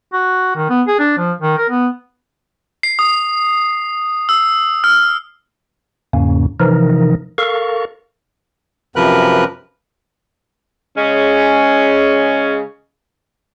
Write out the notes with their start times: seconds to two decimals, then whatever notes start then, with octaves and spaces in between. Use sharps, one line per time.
0.13 F#4
0.56 D#3
0.69 B3
0.87 G#4
0.99 D4
1.18 F3
1.41 D#3
1.58 A#4
1.69 B3
2.83 C7
2.99 D#6
4.29 E6
4.84 F6
6.13 E2 G#2 C#3 A#3 C#4
6.60 C3 E3 F3 D#4 A#4
7.38 A4 A#4 F5 C#6
8.96 F#2 C3 F3 A#4 B4 F#6
10.96 C#3 G#3 C#4